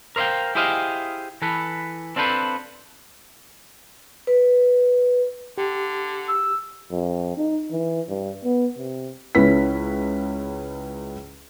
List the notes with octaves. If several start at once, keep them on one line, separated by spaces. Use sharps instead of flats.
A#4 C5 E5 F5 G5
E4 G4 G#4 C5 D#5 F5
E3 A4 B4
C4 D4 F4 A4 B4 C5
B4
D3 G4
E6
F2
D#4
E3
G2
B3
C3
C#2 C#4 E4 B4 B6